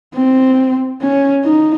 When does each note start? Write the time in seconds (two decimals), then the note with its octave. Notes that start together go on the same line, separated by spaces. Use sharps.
0.14 C4
1.02 C#4
1.45 D#4